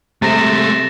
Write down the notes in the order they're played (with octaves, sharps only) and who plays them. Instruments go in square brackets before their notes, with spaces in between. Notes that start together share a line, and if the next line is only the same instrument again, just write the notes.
[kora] C3 [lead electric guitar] G#3 A3 [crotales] A6 A#6 E7